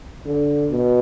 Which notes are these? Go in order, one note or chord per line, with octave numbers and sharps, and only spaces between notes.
D3
B2